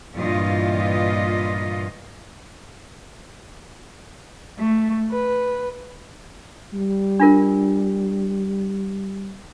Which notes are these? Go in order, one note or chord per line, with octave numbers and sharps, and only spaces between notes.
G2 A#2 E3 F4 D#5
A3
B4
G3
D4 F4 A#4